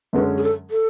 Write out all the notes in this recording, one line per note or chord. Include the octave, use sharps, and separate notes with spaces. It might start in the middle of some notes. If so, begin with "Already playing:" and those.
F#2 D3 G#3 C#4 B4
G#4
A4
A4